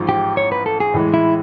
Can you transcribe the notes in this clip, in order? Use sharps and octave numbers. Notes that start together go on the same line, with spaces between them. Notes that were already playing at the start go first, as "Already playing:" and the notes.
Already playing: A1 G#2 F3
G4
C#5
B4
A4
G#4
A2 E3 G#3
E4